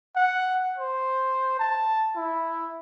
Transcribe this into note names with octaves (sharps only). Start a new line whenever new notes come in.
F#5
C5
A5
E4